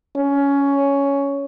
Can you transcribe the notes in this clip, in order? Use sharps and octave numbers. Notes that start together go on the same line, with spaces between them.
C#4